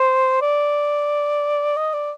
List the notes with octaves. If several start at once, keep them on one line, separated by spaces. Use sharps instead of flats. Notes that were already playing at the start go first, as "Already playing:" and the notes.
Already playing: C5
D5
D#5
D5